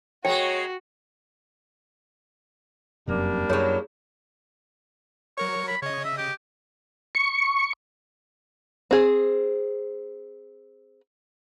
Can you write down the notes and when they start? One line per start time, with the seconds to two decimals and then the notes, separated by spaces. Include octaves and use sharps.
0.25 G#3 A#3 F#4 C#5 G5
3.08 F1 F#2 C3 G3 A#3 D4
3.50 F#2 F#3 E4 G#4 C#5
5.38 F#3 A#4 C#5 C#6
5.68 B5
5.82 C#3 C#5 D#5
6.05 E5
6.18 G4
7.15 C#6
8.91 C4 G#4